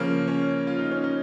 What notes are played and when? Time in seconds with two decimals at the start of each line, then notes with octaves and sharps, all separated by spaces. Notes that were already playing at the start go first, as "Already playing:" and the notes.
Already playing: C#3 F3 A#3 C#4
0.28 C#4
0.67 F4
0.79 D#4
0.91 C#4
1.04 D#4